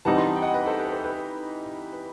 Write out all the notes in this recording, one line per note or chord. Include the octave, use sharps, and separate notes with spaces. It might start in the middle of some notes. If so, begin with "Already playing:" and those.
E3 G3 C4 D#4 F#5 A5
A5 C6
G5
D#5 F#5
B4 D#5
A4 C5
G4 B4
A4 C5
G4 B4
B4